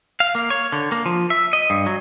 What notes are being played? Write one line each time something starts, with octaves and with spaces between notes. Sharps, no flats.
F5
A#3
C#5
D3
A#3
F3
E5
D#5
G2
F#3